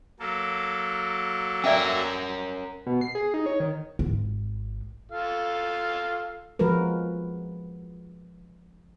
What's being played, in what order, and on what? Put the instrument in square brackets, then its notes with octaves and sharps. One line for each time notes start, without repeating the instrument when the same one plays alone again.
[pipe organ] F#3 A#3 A4
[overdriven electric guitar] C#4 A#4 [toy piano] D5 E5 G5
[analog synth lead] B2
C7
G#4
D#4
C#5
D#3
[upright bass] G#1
[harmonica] F4 A4 F5
[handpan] F3 G#3 F#4 A#4 B4